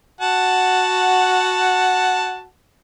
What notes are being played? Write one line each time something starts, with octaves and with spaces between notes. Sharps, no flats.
F#4 F#5 A5